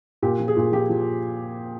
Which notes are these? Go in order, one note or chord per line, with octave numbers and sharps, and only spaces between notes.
A#2 G4
F3
G#4
A#2
F3 G4
F3